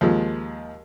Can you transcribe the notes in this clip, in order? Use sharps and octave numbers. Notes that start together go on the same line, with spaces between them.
D#2 F3 G#3